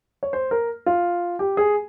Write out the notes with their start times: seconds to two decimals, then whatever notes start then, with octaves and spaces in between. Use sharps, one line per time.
0.23 C#5
0.33 C5
0.51 A#4
0.86 F4
1.39 G4
1.57 G#4